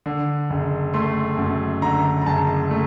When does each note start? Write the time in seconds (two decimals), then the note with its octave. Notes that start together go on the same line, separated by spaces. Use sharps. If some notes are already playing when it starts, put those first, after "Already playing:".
0.06 D3
0.50 F#1
0.94 A3 C6
1.37 F#2
1.82 D3 A#5
2.22 A#5
2.26 F#1 A5
2.71 A3